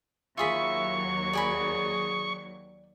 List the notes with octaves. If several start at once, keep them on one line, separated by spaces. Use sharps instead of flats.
D#2 F#3 F4 G#4 E5 B5 C#6
G#4 D5 G#5 B5